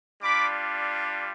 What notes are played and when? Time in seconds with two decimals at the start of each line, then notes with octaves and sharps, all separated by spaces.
0.23 G3 D4 F4 B5 D6